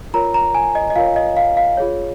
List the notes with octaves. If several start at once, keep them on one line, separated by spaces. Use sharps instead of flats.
F4 A#4 C#5 A#5
A#5
G#5
D#5
D#5
F4 A#4 C#5 F5
D#5
F5
F5
F4 G#4 C#5